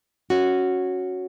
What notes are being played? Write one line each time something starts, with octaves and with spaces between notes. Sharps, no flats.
C#4 F#4